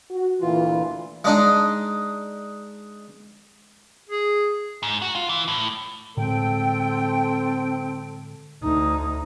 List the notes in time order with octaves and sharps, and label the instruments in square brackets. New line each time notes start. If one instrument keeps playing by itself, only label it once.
[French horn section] F#4
[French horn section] D2 A#2 E3 [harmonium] F4
[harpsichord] G#3 D4 D#4
[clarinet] G#4
[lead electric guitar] G#2
F#4
F4
E3
A2
[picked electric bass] A2 D3 G#3 [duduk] C4 [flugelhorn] A4 [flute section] G5
[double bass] D2 D#4